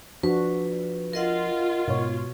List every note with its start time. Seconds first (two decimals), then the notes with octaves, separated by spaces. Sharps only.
0.23 F3 D4 F#4 B4
1.13 F4 A#4 D#5 F#5
1.88 G#2 B2 C#5